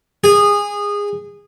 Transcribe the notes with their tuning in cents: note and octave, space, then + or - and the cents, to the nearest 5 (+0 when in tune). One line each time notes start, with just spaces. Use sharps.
G#4 -20